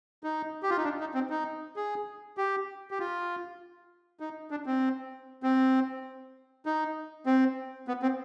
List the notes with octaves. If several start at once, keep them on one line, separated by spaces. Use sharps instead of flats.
D#4
G4
F4
D#4
D4
D#4
C4
D#4
G#4
G4
G4
F4
D#4
D4
C4
C4
D#4
C4
B3
C4